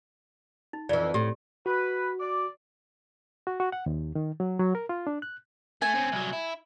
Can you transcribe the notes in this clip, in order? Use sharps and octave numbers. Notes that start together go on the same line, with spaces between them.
D#4
F2 E3 D5
A2 G4
F#4 B4
D5
F#4
F#4
F#5
D#2
D#3
F#3
F#3
A#4
F4
D4
F#6
A3 G#5
C4 C#4
C2 F#3
E4